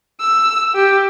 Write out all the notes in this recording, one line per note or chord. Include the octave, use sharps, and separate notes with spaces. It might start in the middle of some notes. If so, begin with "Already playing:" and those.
E6
G4